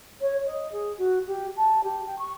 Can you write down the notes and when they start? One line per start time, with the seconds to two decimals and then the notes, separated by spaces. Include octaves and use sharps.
0.21 C#5
0.46 D#5
0.72 G#4
0.98 F#4
1.27 G4
1.56 A5
1.83 G4
2.06 G5
2.18 C#6